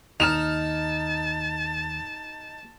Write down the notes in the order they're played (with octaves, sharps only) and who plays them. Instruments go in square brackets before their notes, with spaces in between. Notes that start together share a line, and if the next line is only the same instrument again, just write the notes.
[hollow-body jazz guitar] D#2 [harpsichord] D#4 [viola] A5 [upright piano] F6 E7 F7